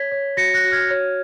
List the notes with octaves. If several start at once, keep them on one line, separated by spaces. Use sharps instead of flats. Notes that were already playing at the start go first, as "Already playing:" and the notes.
Already playing: C#5 G#6 B6
C#5
F#4 A#6 C#7
F#6 A#6
F#4
F6 G#6
C#5